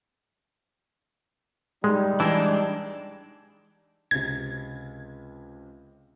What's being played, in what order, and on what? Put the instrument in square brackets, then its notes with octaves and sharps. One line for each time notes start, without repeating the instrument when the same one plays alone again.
[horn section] G3 D#4 [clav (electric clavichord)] G#3
[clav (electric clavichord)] E3 [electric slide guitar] G#3 D4
[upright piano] C#2 C3 [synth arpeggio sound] G#6